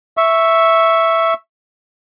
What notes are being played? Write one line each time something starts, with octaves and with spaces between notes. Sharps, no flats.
E5 C#6